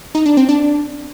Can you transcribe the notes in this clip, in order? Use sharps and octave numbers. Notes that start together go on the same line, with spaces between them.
D#4
D4
C4
D4